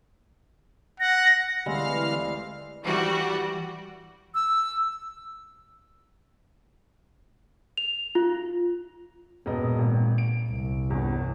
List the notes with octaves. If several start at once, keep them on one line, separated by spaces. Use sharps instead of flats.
F#5 A#6
D2 E3 G3 G#3 C4 F5 F6
E3 G3 F#4
E6
F7
F4
E1 A#2 B3 D#5
G#1
D7
C2
G1 E2